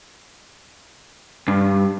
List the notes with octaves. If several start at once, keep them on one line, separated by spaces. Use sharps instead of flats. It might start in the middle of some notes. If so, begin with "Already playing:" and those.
G2